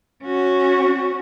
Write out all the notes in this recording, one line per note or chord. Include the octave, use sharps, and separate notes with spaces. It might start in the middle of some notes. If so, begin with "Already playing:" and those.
C#4 F#4